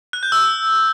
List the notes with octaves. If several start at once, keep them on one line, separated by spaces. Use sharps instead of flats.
F#6
G6
E6